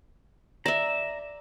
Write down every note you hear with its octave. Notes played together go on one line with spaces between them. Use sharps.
D5 E5 A#5 E7